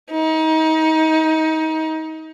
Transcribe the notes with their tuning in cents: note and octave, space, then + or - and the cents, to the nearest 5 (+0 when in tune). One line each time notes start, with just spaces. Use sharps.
D#4 +30